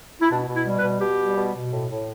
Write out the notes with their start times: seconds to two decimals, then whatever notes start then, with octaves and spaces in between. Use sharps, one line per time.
0.21 E4
0.30 B2 D4
0.48 B2
0.54 E4
0.66 G3
0.78 B4
0.84 B2
1.01 B2 G4
1.19 G3
1.37 B2
1.55 B2
1.72 A2
1.90 A2